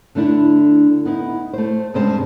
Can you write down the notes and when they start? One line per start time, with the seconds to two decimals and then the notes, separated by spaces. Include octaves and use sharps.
0.15 D3 A3 D4 E4
1.05 B3 D#4 E4
1.53 A3 C5
1.94 G2 C3 G#3 C#4 C5 A5